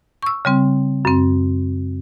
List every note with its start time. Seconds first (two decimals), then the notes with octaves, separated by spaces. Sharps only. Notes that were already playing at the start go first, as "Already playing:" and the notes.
0.22 C#6 E6
0.45 C#3 G3 C4
1.05 F#2 C4